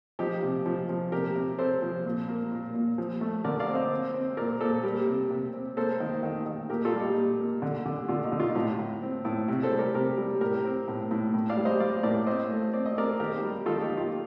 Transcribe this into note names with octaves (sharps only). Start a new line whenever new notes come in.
F3 D#4 G4
C3
F3
F3
C3 G4 A#4
C3
C4 A4 C5
F3
A#2
A#3
A#2
A#2
F3
A3
D3 A#4 D5
D5 F5
C4
C5 D#5
C4
C4
A#2 A#4 D5
A#2 A4 C5
G3 G4 A#4
C3
C3
C4
A#3 A4 C5
D#3
D#3
D#3
A#2 G4 A#4
F4 A4
G3
D#4 G4
A#2
A#3
D3
D3
D3 F4
D#4
D3
F4
D#4
A2 F4
A2
C4
A2
C3
A4 C5
G3
G4 A#4
C3 G4 A#4
G3
A2 G4 A#4
C4
A2
A2
A2
D5 F5
G3
C5 D#5
G3 D5 F5
A2 A#4 D5
C4 C5 D#5
A3
C4 D5
D#5
C4 A#4 D5
D#3 G4 A#4
G3
D#3 F4 A4
D#4 G4
D#3
F4